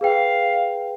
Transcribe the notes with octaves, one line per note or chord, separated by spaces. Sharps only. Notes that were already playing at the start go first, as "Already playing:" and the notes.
G#4 B4 F5 G5